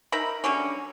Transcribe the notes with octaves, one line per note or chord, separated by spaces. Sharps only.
D#4 A#4 E5 B5
D3 F#3 G3 C#4